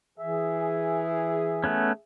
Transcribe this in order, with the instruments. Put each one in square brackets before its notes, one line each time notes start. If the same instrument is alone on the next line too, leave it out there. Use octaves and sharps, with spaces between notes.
[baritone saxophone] E3 [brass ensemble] G#4 [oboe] E5
[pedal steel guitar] A3 B3 C#4